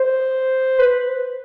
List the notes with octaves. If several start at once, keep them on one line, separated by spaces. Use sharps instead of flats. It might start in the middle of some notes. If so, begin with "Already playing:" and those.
Already playing: C5
B4